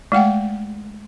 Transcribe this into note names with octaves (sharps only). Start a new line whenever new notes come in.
G#3 A3 F#5 G5